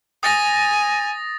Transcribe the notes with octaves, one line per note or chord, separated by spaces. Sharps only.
G#5 D#6 A6 A#6